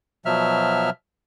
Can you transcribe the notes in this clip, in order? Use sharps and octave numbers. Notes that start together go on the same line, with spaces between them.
B2 F3 F#3 E5 F6